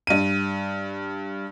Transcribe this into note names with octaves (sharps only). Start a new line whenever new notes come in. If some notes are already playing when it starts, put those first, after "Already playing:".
G2 D#7